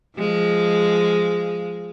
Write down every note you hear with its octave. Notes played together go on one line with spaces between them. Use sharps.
F3 G#3